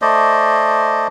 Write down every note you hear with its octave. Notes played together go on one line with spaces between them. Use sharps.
A3 C5 D5 D#5